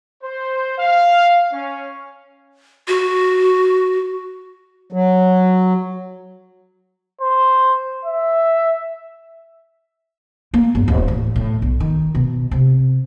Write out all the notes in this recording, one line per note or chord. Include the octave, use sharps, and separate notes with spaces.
C5
F5
C#4
F#4
F#3
C5
E5
A#3
G1
D1
A1
A2
B1
D#3
B2
C3